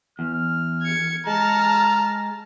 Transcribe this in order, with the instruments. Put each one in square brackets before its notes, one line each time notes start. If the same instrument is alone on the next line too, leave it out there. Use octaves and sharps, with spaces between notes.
[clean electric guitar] E2 [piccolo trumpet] F6
[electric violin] G#6 C#7
[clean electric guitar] G#3 [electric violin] A5 F6 [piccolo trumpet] A#5